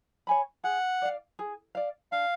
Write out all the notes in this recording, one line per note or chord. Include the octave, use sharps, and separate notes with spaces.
C#5 G#5 B5
G#4 F#5
D5 F5
G#4
D5 F5
D4 F5